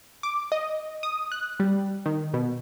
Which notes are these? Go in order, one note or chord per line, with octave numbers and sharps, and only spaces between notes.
D6
D#5
D#6
F#6
G3
D#3
B2